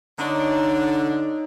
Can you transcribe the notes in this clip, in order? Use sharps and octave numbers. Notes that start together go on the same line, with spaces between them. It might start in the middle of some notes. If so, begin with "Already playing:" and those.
D3 D4 D#4 C#5 A#5